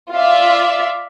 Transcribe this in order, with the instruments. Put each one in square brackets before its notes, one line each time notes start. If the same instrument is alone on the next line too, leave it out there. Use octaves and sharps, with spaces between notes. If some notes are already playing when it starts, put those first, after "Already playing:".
[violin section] F4 D5 E5